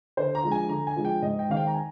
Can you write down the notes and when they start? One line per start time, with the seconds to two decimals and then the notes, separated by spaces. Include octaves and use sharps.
0.17 D3 C5
0.35 A#5
0.43 F3 G#3 D4
0.52 G#5
0.69 D3 A#5
0.87 G#5
0.96 F3 G#3 D4
1.05 G5
1.22 G#2 D#5
1.39 G5
1.48 D#3 G#3 C4 F5
1.57 G5
1.67 A#5
1.74 G#5